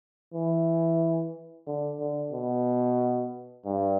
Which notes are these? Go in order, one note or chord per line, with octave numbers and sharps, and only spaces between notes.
E3
D3
D3
B2
G2